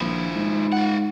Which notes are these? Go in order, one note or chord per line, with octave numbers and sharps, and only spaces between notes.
A#1 F3 E4
G#2
F4 F#5